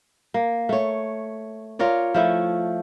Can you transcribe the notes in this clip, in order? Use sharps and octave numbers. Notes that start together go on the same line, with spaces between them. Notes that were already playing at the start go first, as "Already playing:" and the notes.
A#3
A3 C#5
F4 A#4 C#5 D5
F3 A3 E4